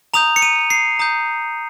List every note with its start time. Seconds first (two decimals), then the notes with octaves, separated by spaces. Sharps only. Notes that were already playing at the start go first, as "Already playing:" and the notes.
0.14 A#5 D#6 G6 F7
0.36 C#7
0.42 D#7
0.70 C7
0.99 A#5 D#6 G6